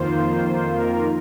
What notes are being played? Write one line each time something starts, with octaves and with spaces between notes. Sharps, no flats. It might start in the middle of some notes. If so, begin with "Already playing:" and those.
Already playing: F2 D#3 A#3 F4 C5
A#4